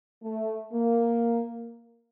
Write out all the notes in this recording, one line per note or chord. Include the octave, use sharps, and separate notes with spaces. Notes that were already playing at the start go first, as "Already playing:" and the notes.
A3
A#3